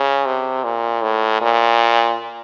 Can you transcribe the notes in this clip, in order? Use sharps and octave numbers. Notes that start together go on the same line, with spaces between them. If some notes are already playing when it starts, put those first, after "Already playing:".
Already playing: C#3
C3
A#2
A2
A#2